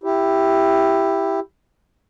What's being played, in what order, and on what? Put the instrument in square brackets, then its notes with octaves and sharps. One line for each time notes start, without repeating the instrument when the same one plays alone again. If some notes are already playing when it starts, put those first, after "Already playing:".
[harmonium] E4 G4